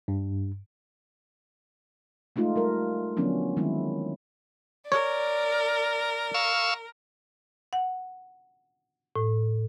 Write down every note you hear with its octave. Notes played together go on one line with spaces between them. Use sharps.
G2
G#3 A3 D#4 F4
G3 A#4
D3 F3 F#3 B3 C#4 D4
D#3 F#3 G#3 C4 E4
A#4 C#5 D5
F5 C#6 E6
F#5
A2